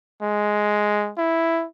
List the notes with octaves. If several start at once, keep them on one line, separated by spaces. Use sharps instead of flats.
G#3
E4